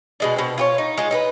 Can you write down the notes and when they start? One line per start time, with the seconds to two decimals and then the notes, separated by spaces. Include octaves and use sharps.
0.20 B2 G#3 D4
0.36 B2 C4
0.58 F4 G4 C#5
0.78 D#4
0.98 G#3 F4
1.11 D#4 G4 B4